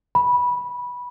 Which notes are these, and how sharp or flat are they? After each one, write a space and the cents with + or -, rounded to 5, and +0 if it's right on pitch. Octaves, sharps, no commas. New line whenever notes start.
B5 -15